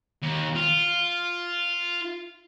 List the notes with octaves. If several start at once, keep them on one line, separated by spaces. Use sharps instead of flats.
D#2
F4